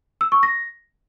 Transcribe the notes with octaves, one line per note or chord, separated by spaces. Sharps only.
E6
C#6
A#6